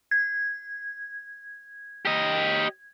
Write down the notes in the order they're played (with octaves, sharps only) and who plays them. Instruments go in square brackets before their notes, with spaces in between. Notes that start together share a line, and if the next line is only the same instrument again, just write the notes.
[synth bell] G#6
[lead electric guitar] G4 D#5